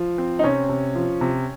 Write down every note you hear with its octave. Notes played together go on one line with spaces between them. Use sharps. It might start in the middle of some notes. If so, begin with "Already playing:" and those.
Already playing: F3
C4
D#4
C3 C#4
C3
F3
C3